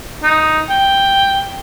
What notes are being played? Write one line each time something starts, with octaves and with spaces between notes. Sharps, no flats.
D#4
G5